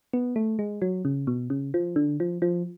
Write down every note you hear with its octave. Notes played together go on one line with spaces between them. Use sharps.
B3
A3
G#3
F#3
C#3
B2
C#3
F3
D3
F3
F3